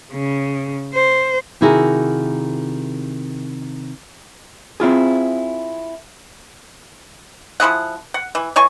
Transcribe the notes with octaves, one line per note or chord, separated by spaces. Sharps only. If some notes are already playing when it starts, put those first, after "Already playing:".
C#3
C5
C3 D#3 E4 F#4 G#4 A#4
C4 E4 F4 G#4
F3 E4 G#4 F#5
F#5
E3
E3 C#5 G#5 C#6